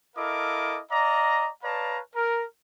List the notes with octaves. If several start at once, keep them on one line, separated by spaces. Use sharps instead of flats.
E4 A4 A#4 D#5 F5 D6
D5 D#5 F5 A#5
B4 C#5 D5 F5 A5 A#5
A#4